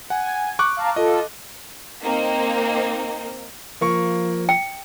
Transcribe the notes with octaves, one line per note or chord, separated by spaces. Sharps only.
F#5 G#5
C#6 D6 F#6
F5 A5 A#5
F4 A4 D#5
A#3 C4 D#4
F3 A#3 C#6
G5